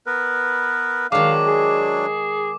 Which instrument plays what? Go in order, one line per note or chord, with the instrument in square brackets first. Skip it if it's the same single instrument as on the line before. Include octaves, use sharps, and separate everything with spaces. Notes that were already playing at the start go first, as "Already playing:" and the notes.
[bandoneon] B3 A#4 B4
[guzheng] D#3 G#3 [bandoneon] F#3 D4 [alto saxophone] F5 [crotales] D6
[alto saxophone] G#4